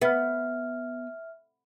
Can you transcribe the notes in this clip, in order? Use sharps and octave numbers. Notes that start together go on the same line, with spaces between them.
B3 E5 F6